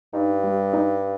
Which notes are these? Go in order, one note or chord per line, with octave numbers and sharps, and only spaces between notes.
G2 D#4
G3
D#4